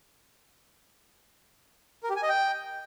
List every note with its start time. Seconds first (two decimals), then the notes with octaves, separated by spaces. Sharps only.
2.03 A#4
2.10 G4
2.16 G#5
2.23 D#5
2.29 G5